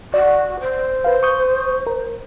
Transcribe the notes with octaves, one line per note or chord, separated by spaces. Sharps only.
F#4 D5
C5
B4 F5
C#6 D#6 G6
A#4